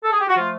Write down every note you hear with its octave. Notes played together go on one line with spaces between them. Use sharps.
A4
G#4
G4
F#4
F3 A3 F4